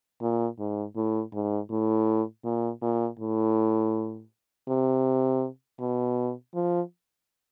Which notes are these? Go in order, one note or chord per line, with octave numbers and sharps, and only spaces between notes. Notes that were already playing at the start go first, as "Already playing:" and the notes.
A#2
G#2
A2
G#2
A2
A#2
A#2
A2
C3
B2
F3